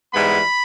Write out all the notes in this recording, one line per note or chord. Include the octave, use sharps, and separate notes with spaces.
G#2 E3 G3 B3 B5